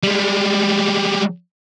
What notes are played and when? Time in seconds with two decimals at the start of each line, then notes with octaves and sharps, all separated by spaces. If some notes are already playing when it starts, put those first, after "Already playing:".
0.03 G3 G#3